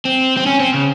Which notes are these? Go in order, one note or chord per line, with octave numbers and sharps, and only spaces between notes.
C4
C4
C#4
C4
C#3